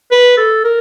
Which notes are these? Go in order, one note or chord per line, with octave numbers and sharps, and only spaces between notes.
B4
A4
A#4